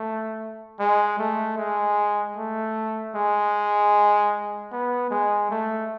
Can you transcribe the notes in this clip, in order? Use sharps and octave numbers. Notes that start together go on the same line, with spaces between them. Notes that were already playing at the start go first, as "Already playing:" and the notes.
Already playing: A3
G#3
A3
G#3
A3
G#3
B3
G#3
A3